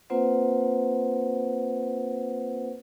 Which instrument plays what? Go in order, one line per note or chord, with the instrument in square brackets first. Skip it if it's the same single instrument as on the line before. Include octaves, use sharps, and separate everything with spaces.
[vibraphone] A#3 C4 F4 B4 C5 F#5